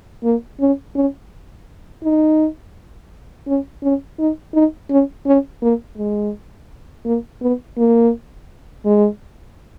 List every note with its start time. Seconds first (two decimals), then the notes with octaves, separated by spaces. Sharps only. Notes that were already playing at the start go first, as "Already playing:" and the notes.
0.24 A#3
0.60 C#4
0.96 C#4
2.04 D#4
3.47 C#4
3.83 C#4
4.19 D#4
4.54 D#4
4.90 C#4
5.27 C#4
5.62 A#3
5.98 G#3
7.06 A#3
7.42 B3
7.77 A#3
8.85 G#3